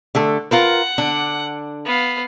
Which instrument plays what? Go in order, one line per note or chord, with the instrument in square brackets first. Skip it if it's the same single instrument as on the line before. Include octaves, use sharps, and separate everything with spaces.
[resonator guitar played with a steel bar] D3 A3 A4
[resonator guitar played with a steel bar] F4 A#4 B4 [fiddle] F#5
[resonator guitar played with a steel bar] D3 D4
[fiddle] B3 F5